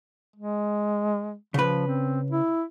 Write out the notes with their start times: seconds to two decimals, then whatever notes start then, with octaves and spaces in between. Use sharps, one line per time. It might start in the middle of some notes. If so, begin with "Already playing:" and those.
0.36 G#3
1.54 C#3 F3 B4
1.87 C4
2.31 E4